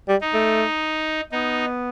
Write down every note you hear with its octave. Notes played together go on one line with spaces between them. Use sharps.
G3
D#4
A3
B3 D#4